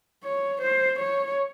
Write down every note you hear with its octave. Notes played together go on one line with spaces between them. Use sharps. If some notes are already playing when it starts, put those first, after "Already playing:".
C#5
C5
C#5